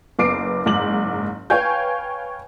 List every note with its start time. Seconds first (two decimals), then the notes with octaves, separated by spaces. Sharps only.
0.19 F#1 B3 D6 C7 D7
0.66 F#1 G#2 D6 F#7
1.50 B4 C#5 F5 G5 G#5 G6